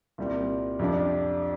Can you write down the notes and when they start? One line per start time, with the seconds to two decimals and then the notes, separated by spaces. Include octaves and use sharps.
0.18 C2 A#2 G3 C4
0.79 F2 C3 F3 D4